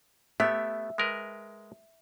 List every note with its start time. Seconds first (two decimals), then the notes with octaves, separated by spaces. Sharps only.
0.40 A3 B3 G4 E5
0.98 G#3 A#4 B4